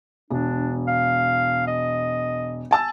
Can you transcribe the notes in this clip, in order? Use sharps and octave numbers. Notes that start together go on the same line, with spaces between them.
E1 D4
F5
D#5
G#5 A5 E6